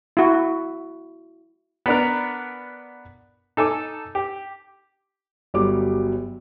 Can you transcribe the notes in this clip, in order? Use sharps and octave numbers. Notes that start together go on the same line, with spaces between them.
E4 F#4
B3 D4 A#4
D#4 A4 G#5 D6
G4
G1 F#3 G3 D6